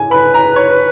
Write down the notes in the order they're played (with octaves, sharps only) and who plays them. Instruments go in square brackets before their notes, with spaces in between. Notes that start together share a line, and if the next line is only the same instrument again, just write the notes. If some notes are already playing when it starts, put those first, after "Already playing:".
Already playing: [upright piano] G#5
[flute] B4 [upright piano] B5
[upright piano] A#5
C#5